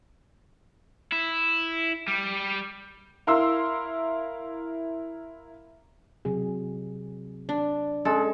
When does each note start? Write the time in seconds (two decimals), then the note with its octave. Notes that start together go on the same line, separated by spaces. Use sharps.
1.12 E4
2.08 G3
3.27 E4 A#4 F5 C6 E6
6.25 C3 F#3 G#4
7.49 D4
8.05 G#3 C#4 A4